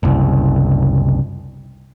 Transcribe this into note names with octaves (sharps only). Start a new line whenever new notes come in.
F#1 C2